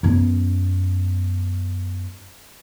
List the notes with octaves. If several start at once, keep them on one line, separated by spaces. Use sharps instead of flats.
F#2 B3